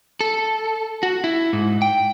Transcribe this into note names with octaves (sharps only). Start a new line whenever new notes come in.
A4
F#4
E4
G#2
G5